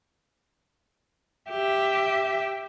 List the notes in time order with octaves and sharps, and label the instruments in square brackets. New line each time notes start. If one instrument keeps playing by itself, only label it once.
[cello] G4 E5